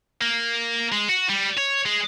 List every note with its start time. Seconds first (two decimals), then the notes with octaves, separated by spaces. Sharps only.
0.21 A#3
0.92 G#3
1.09 F#4
1.29 G3
1.57 C#5
1.86 G#3